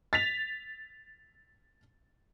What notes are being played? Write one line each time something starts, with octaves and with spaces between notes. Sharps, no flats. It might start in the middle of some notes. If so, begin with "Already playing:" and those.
A6 B6 F7